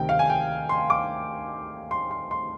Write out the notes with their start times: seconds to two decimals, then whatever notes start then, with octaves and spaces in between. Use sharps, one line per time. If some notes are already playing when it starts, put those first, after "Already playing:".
Already playing: D2 C3 D#3 G5
0.09 F5
0.19 G#5
0.30 G5
0.69 C6
0.90 D6
1.91 C6
2.11 C6
2.31 C6